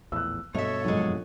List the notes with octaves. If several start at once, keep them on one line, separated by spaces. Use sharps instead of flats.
A#1 E2 A2 E6 F#6
G2 B2 A3 A4 C#5 D#5 E5
F1 A#1 F#2 G#3